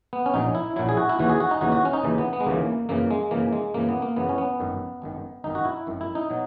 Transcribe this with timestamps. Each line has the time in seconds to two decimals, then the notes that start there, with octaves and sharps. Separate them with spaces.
0.13 B3
0.26 C#4
0.34 A#1 A#2 F#3 D#4
0.55 E4
0.76 A#1 A#2 F#3 E4
0.89 G#4
0.97 F#4
1.09 E4
1.19 D#2 C#3 E3 F#4
1.29 G#4
1.40 F#4
1.51 D#4
1.61 D#2 C#3 E3 F#4
1.72 F#4
1.85 C#4
1.93 D#4
2.03 D#2 C#3 E3
2.18 B3
2.33 B3
2.41 G#3
2.46 D#2 C#3 E3 A#3
2.89 F#2 C#3 E3 A#3
3.11 G#3
3.31 F#2 C#3 E3 A#3
3.53 G#3
3.74 F#2 C#3 E3 A#3
3.89 B3
4.02 A#3
4.16 F#2 C#3 E3 B3
4.29 C#4
4.38 B3
4.59 G#1 F#2 D#3
5.02 G#1 F#2 D#3
5.44 G#1 F#2 D#3 D#4
5.55 F#4
5.65 E4
5.87 G#1 F#2 D#3
6.01 E4
6.15 D#4
6.30 B2 F#3